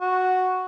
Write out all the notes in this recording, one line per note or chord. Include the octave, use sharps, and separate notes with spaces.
F#4